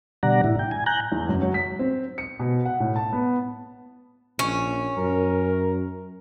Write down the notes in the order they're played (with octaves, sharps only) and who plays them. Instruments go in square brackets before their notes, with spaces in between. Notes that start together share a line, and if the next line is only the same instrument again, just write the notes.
[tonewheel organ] B2 D3 G3 D5 F#5 A#5
A2 E4
G5
G#5
G#5 A#5 F#6 G6
[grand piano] E2
F#2
F#3
B6
C4
C#7
B2
F#5
A2
A5
B3
[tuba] A#1 [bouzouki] C#4
[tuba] F#2 [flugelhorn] A#4